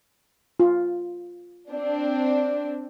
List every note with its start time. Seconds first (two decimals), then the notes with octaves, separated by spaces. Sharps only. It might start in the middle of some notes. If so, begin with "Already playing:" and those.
0.60 F4
1.71 C4 D4